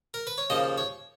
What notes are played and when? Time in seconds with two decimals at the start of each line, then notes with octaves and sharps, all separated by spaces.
0.14 A#4
0.27 B4
0.38 C#5
0.50 D#2 C#3 F3 D#5
0.78 C#5